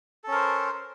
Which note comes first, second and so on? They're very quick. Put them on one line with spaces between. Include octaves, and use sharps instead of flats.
A4 C#4 A#4 C5